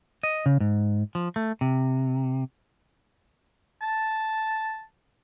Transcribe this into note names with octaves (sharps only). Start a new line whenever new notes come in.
D#5
C#3
G#2
F3
A3
C3
A5